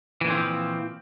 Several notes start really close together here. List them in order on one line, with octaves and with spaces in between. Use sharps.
E3 A#2 D3 C4 F3